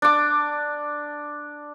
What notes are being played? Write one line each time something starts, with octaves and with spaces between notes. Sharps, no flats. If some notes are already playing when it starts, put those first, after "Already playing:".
D4 D6